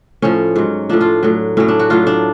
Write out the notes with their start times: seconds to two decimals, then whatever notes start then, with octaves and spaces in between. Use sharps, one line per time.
0.22 A2 F3 C#4
0.56 G#2 F#3
0.90 A2 F3 D4
1.01 F4
1.23 A2 F#3
1.57 A2 F#3 C#4
1.68 D4
1.79 F#4
1.90 A2 F#3 F4
2.07 D4